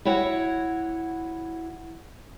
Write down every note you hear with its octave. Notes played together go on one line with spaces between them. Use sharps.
E4 F#4 C#5 F#5